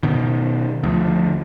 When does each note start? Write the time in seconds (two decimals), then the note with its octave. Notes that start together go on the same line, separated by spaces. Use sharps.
0.03 B2 D#3
0.83 D2 F3